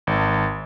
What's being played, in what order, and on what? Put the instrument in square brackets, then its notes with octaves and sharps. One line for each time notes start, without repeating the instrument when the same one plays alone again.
[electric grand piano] G#1